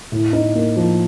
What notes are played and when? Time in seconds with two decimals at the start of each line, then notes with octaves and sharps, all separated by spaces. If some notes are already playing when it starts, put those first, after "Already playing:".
0.12 A2
0.33 D#4
0.55 A#3
0.77 F3